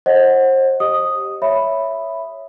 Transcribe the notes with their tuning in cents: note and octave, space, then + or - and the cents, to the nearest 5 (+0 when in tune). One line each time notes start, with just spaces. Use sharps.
C5 +30 D#5 +0 F#5 +0
G4 +0 D#5 +0 D#6 +0
C#5 +0 E5 +5 B5 +0